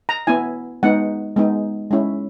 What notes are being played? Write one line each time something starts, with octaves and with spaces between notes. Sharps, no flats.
A#5
B3 E4 G#5
G#3 B3 D#4 F#5
G#3 B3 D#4
G#3 C#4 E4